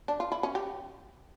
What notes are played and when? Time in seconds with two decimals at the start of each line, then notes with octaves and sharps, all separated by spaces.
0.08 D4
0.20 F4
0.32 E4
0.43 C#4
0.55 G4